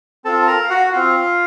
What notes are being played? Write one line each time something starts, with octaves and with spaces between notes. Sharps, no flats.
C4 F4 A4 A5
A5
A#4 A#5
F5
F#4 F#5
F#5
C4 F4 F5